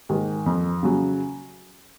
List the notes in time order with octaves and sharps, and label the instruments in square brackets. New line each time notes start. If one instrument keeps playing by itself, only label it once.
[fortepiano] G#2 D#3
F2
C#3 F#3